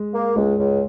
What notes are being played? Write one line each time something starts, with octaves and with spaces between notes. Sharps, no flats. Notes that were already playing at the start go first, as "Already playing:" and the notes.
Already playing: G#3
A#3
C#2 G#3
C#2